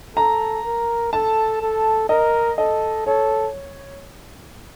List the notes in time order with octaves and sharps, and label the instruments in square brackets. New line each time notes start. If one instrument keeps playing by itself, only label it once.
[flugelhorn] A4 [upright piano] A#5
[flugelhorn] A#4
[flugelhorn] A4 [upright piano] A5
[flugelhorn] A4
[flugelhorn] A#4 [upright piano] D#5
[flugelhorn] A4 [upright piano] D#5
[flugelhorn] A4 [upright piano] C#5